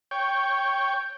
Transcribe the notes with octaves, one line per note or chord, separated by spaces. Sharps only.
C#5 G5